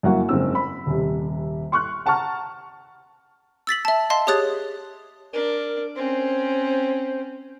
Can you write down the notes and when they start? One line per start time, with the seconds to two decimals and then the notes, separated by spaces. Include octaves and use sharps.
0.03 F#2 A#3 E4 F#4 F#5
0.29 F#1 G#2 C4 E6
0.55 B5
0.86 D#1 C3
1.72 C6 C#6 F6 F#6
2.06 F#5 A5 A#5 C#6 F6
3.67 E6 A6 B6 F#7
3.85 E5 A5
4.10 D#5 F5 A5 C6
4.27 G4 G#4 C#5 D#6 F#6 A6
5.33 D4 A#4
5.96 C4 C#4 C5